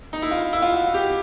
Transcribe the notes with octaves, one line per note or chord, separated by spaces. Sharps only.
D#4
E4
F4
E4
F4
F#4
G4